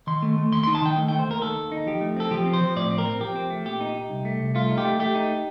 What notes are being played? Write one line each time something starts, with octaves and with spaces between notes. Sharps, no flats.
D#3 C6
A3
A3
D#2 C6
D#4 C6
A5
D#3 G5
A3
A3 G5
C5
D#2 A#4
D#3 A4
D#2
D#4
F3 G4
A3
C4 A4
F3 G4
C4
C5
F3
A2 D5
C4
A#4
C4
F3 G4
C4
A3
A#2 G4
D#4
D#4
C2
A3
C2
A3 F4
D#4
G4
A3
A3 G4
D#4